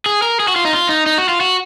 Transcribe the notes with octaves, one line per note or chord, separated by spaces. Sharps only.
G#4
A#4
G#4
F#4
F4
D#4
F4
D#4
D#4
F#4
F4
F#4